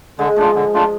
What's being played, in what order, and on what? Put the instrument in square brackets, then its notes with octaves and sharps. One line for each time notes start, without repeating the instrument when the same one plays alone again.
[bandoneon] D3 [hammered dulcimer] G#3
[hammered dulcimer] F3 [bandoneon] A3 D4 F4
[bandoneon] D3
A3 D4 F4